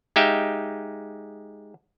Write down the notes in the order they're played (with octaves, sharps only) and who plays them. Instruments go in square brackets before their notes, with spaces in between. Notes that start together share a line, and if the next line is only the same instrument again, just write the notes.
[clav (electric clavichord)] G#3 D#4 G4 E5 F5 G5